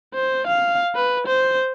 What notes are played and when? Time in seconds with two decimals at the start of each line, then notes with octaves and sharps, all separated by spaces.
0.14 C5
0.47 F5
0.95 B4
1.27 C5